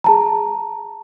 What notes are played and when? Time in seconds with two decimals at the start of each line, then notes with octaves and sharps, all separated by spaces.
0.04 G#4 A5 A#5